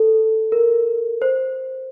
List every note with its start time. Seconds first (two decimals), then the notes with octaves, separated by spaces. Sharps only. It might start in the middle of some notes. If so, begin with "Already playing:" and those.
Already playing: A4
0.52 A#4
1.22 C5